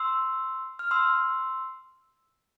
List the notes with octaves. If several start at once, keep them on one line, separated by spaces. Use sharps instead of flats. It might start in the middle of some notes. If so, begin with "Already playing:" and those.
Already playing: C6 E6
F6
C6 E6